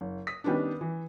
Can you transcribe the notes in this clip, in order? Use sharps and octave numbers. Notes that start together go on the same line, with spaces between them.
F#1
D#6 B6
D#3 G3 B3 C#4 D4
E3